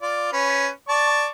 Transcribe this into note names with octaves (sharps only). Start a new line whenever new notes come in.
F4 D5
C#4 B4
D5 A5 C#6